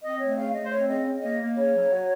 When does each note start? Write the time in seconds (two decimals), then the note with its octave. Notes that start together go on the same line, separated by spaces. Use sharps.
0.03 C4 D#5
0.20 A3 C#5
0.37 C#3 F5
0.55 A3 D#5
0.64 C5
0.71 C4 C#5
0.88 C#3 D#5
1.05 C#3
1.22 A#3 D#5
1.40 A#3
1.57 C#3 C#5
1.74 F#3
1.91 F#3